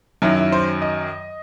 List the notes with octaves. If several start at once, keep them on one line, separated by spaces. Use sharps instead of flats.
F#2 D#3 F#3 E4
E4
C5
D#5